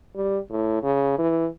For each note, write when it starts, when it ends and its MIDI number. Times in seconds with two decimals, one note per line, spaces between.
0.15 0.38 55
0.50 0.80 45
0.83 1.14 49
1.18 1.47 52